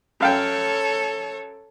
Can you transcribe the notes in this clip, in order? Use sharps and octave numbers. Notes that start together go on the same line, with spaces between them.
F#2 A4 C#5 F5 G5